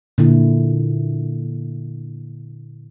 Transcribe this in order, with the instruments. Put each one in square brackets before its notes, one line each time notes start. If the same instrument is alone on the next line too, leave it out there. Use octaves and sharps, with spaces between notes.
[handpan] A#2 D3 E4